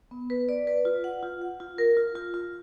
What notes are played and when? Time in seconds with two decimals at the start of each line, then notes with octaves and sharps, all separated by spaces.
0.11 B3
0.30 B4
0.49 D5
0.67 B4
0.85 F4
1.04 F#5
1.23 F4
1.42 F#5
1.60 F4
1.78 A#4
1.97 F4
2.15 F4
2.34 F4